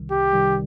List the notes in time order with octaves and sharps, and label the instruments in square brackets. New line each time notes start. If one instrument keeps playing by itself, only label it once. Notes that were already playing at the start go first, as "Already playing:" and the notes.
Already playing: [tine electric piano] C2 C3 D#3 G3
[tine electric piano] C2 [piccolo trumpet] G4
[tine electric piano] C3 D#3 G3